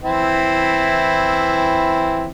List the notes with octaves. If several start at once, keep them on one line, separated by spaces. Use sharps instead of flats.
E3 C4 E4